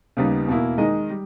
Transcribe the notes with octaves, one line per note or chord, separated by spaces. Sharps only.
D#2 C#3 G3 B3 D#4
E2 B2 A#3 E4
D#3 G#3 D#4 G#4 D#5
G3